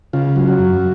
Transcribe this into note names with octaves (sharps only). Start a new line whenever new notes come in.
C#3 F4
F#3
F#4
F#2